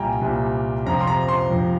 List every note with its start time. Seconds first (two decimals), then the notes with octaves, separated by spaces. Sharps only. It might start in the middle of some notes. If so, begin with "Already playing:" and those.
Already playing: C2 A#2 G3 G5 G#5 A#5
0.21 C2 A#2 G3
0.86 F2 C3 F3 A#5
1.01 C6
1.07 A#5
1.28 C6
1.50 F2 C3 F3